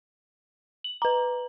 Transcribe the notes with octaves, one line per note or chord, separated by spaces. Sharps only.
F#7
B4 A#5